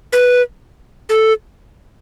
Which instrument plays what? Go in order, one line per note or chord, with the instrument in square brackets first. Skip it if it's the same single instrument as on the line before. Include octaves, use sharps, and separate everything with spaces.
[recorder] B4
A4